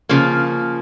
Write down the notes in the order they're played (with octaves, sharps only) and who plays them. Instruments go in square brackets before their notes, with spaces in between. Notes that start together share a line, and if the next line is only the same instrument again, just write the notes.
[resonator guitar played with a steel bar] C#3 F3 A#3